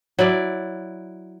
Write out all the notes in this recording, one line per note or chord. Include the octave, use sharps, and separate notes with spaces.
F#3 E4 D5